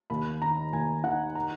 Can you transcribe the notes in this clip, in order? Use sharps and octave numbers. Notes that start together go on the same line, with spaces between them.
D#2 B5
D#3 A#5
D#2 G#5
D#3 F#5
A#5